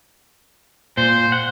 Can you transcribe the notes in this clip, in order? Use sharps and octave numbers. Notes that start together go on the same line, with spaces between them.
A#2 C5
F#5